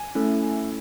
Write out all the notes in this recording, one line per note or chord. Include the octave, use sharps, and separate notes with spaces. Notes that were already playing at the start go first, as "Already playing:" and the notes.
Already playing: G#5
A3 C#4 E4 A4